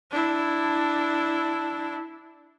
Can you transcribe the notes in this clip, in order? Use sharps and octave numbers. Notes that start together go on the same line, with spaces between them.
D4 E4